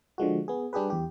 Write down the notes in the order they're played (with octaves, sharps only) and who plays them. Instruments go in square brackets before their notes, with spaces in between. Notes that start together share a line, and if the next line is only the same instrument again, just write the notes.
[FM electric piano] D3 F3 G#3 F#4
B3 G#4
G3 D4 G4 G#4 B4
E2 G4